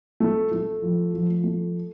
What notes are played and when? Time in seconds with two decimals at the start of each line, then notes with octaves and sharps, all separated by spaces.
0.20 A3
0.52 A3
0.82 F3
1.14 F3
1.44 A3